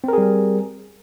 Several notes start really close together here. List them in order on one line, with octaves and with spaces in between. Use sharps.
C4 A#4 G#4 G3